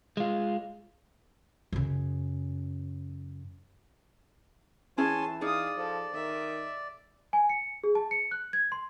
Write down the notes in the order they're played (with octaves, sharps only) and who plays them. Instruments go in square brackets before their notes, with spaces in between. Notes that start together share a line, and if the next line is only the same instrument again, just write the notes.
[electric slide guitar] G#3 F4
[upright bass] F#2 C#3
[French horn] E3 [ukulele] C#4 E4 G#4 [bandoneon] C#5 G#5 C6 [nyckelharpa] A5
[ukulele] D#4 G#4 [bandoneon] D5 [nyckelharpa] F5 D#6
[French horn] F3 [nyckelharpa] A4
[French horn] D#3 [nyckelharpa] E5
[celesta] G#5
C#7
G#4
A5
C#7
F#6
G#6
C6